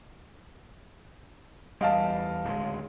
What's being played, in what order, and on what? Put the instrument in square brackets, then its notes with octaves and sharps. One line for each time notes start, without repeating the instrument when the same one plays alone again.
[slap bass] E2 G3 [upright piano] D#5 F5 A5
[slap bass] D1 C#2 G#3